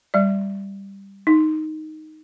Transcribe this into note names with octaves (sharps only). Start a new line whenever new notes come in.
G3 D5
D#4